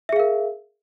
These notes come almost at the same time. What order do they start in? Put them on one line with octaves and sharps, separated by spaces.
E5 G#4 F5 A#4